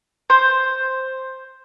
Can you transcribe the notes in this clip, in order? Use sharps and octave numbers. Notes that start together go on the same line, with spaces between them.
C5